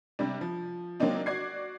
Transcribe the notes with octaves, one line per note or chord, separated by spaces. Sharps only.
C3 G3 D4
F3
F#3 A#3 C4 D4 D#4
F#4 D5 G#6 C7